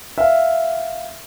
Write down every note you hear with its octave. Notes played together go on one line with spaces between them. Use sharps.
E5 F5